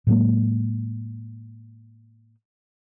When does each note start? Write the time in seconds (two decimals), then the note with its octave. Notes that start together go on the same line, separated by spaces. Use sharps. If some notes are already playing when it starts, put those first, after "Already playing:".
0.07 A2 F#3 G#3 A#3